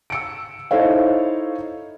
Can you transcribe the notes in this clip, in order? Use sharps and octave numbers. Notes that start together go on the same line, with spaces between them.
E6 C#7 D7
D#4 E4 A4 C5 C#5 F5